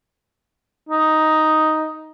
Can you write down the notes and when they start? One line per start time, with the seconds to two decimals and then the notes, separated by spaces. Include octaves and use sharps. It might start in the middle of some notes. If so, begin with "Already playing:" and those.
0.89 D#4